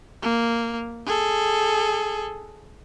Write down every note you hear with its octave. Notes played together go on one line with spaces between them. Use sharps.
A#3
G#4 A4